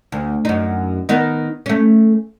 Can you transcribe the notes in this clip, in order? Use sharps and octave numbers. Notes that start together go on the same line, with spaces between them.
D2
F#2 D#4
D#3 B3 D#4
A3 C#4